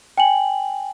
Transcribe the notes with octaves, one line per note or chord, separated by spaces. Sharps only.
G5 G#5 F#7